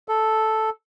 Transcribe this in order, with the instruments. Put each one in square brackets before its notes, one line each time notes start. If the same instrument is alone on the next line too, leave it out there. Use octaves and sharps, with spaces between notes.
[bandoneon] A4